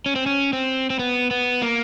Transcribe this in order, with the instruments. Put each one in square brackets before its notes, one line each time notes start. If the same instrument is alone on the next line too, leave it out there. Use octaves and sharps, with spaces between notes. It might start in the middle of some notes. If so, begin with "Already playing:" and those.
[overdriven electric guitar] C#4
C4
C#4
C4
C4
B3
B3
A#3